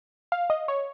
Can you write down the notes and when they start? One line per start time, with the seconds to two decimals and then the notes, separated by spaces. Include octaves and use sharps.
0.32 F5
0.50 D#5
0.68 C#5